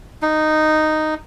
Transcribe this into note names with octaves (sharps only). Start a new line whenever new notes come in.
D#4